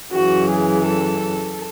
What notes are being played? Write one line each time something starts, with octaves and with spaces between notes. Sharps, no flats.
F#2 C#3 E3 F#4
G#4
A4